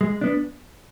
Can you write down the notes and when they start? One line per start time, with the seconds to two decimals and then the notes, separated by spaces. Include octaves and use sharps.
0.01 G#3
0.21 B3 D4